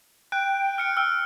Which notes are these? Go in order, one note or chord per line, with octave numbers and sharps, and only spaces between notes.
G5 F#6
F6 C#7 D7
E6 F6